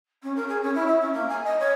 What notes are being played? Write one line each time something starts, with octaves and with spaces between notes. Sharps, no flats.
C#4
A#4
G#4
C#4
E4
E5
C#4
A#3
G#5
D#5
C#5